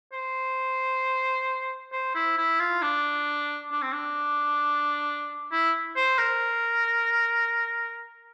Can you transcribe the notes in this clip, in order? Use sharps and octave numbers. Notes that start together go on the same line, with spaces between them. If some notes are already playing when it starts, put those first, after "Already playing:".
C5
C5
E4
E4
F4
D4
D4
C4
D4
E4
C5
A#4